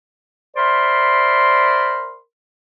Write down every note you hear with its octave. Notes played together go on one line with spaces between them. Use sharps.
A#4 C5 D5 E5 B5 C6